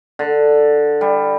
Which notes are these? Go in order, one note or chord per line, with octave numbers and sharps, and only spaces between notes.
D3
G3